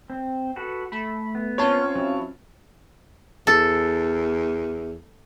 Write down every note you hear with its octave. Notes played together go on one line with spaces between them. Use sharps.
C4
F#4 A4 B4
A3 B5
B3
C4 C#4 F4 C#5 A5
F#3 E4
E2 A4